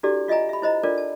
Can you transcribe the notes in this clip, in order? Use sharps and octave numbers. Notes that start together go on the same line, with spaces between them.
D4 E4 F#4 G4 A4 D5
F4 D#5 E5 G#5 A#5
E5 B5
E4 C5 D#5 A#5
D4 F4 A4 A#4 D5
A5